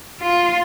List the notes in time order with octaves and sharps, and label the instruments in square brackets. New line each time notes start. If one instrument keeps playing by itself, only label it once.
[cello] F4